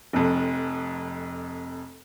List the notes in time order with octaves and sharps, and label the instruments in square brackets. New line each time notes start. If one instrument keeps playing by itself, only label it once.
[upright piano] F1 F2